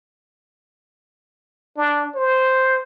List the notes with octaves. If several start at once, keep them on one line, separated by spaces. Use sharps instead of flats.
D4
C5